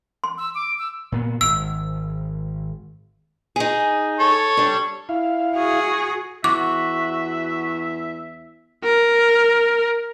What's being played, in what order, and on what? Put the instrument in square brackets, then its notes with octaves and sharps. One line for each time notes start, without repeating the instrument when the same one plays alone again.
[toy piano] C6
[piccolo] E6
D6
E6
[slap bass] A#2 B3
[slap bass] G#1 [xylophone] E6
[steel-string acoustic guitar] D#4 G#4
[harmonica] A4 C#5
[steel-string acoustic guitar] G3 D4
[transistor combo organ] E4 F5
[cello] F#4 G#4
[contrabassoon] E2 [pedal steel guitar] F#4 [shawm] E5 [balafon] D6
[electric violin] A#4